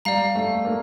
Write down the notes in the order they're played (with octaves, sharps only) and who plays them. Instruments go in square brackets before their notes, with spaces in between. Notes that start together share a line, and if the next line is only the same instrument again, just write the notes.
[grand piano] G3 [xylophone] D5 F5 A#5
[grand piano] A3
A#3